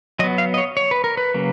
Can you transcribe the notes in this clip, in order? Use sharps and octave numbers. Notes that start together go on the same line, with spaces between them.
F#3 B3 D#5
F5
D#5
C#5
C#5
B4
A#4
B4
C#3 F#3 A#3